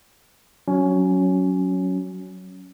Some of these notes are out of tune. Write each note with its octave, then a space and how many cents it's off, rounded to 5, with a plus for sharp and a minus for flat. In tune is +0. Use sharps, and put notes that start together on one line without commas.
F#3 +0 C#4 +10